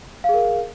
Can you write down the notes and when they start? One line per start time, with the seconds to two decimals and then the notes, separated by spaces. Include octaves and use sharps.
0.24 F5
0.29 G#4
0.34 A#4